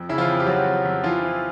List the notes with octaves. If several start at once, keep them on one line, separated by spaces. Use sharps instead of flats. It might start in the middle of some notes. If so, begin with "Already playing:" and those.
Already playing: F2
C#3 E4
F3 F4
F2
G4
F2 F#3 F#4
F2
F2
E3 F3 F4
E3